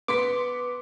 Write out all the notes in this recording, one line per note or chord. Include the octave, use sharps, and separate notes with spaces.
B3 C6 D6 B6